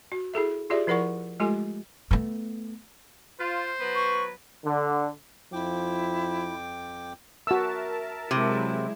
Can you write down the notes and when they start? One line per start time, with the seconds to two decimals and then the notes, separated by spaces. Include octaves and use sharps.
0.12 F#4
0.34 E4 G#4 A4 E5
0.70 F4 G4 G#4 D5 E5
0.87 F3 E4 A#4 D5 F#5 C#6
1.40 G#3 A3 F4 G4 A4 G#5
2.11 A3 B3
3.40 F4 C5
3.80 F#3 B3 B4
3.95 C#6
4.64 D3
5.53 F2 F3 E4 G5 D6
7.47 F#4 A#4 E5 A5 E6
8.31 C3 F#3 G#3 E4